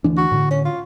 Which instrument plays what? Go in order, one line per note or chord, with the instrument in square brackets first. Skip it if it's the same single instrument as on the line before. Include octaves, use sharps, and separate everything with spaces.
[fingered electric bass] D2 E3 D4
[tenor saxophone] F#4
[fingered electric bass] A2 D3
[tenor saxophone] C#4
F4